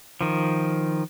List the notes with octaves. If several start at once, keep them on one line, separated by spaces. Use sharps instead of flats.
D#3 F3